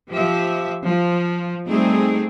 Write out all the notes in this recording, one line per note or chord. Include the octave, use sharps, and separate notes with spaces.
F3 G4 E5
F3
G3 A3 C4 D#4 G#4